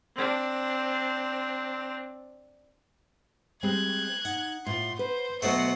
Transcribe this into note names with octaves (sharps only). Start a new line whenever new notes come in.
C4 D4
G3 G#3 C4 F#6 G#6
D#4 F#5
A2 F4 C6
B4 C5
D2 B2 F#3 A3 C5 F#5 C7